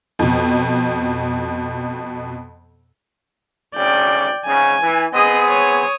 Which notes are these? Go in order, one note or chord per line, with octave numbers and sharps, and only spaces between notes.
F2 B2
G#1 D2 C#3 D5 G5
G#2 C#3 G#5
E3
B3 C4 G#4 D#5 D#6
C#5 D#6